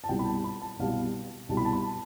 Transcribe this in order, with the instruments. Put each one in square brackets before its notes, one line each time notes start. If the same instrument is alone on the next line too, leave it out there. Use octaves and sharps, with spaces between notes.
[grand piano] A5
C2 B2 G3 G5
B5
A5
A5
B5
A5
C2 B2 G3 F5
C2 B2 G3 A5
B5
A5
B5